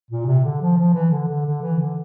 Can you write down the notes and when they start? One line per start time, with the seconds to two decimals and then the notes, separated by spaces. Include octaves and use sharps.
0.10 A#2
0.26 C3
0.44 D3
0.61 F3
0.78 F3
0.94 E3
1.11 D3
1.28 D3
1.46 D3
1.62 E3
1.79 D3